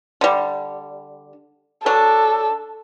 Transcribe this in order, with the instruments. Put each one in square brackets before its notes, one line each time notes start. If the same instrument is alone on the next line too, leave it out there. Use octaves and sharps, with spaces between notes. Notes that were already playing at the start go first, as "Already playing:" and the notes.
[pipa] D3 G3
[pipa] F#3 D4 [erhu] A4